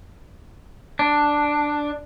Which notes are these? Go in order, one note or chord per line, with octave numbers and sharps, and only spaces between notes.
D4